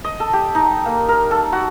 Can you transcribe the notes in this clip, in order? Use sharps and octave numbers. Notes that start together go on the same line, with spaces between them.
D#5
A4
G4
D#4
A#3
A#4
A4
F#4